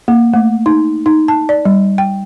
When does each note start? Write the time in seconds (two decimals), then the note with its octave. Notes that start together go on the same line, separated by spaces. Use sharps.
0.08 A#3
0.33 A3
0.66 D#4
1.06 D#4
1.28 A5
1.49 D5
1.65 G3
1.98 G5